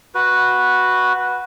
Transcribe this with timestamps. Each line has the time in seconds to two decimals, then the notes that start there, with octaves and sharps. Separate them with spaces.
0.15 F#4 B4